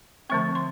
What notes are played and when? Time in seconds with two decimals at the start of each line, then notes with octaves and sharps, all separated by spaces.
0.30 D3 F3 A3 C4 C#6
0.55 C6